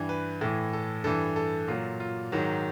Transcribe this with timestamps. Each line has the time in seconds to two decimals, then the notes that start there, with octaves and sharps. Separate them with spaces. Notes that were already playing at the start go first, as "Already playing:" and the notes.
Already playing: G2 E3
0.09 B4
0.41 A2 E3
0.73 A4
1.04 G2 E3 A4
1.36 A4
1.68 A#2 F#3 F4
2.00 F4
2.32 G#2 D#3 F#3